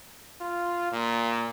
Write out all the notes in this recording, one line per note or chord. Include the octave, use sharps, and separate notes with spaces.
F4
A#2